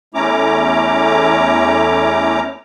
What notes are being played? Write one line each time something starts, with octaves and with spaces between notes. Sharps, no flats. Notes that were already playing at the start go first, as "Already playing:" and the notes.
E2 A3 C#4 E4 A#5 D6